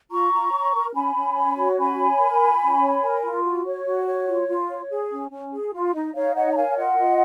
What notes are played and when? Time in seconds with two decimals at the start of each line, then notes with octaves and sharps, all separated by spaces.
0.11 F4 A#5 C#6
0.33 F4
0.53 C#5
0.75 A#4
0.94 C#4 G#5 B5
1.15 C#4
1.36 C#5
1.57 F#4
1.78 C#4 G#5 B5
1.99 C#5
2.19 A#4
2.40 F4
2.62 C#4
2.81 C#5
3.03 A#4
3.23 F4
3.44 F#4
3.65 C#5
3.85 F#4
4.06 C#5
4.27 F4
4.48 F4
4.69 C#5
4.90 G#4
5.11 C#4
5.31 C#4
5.53 G#4
5.74 F4
5.94 D#4 D#5
6.14 D#4 C#5 F5
6.35 C#5 D#5 F#5
6.52 A#5
6.56 A#4 F5 G#5
6.77 F4 D#5 F#5
6.98 F4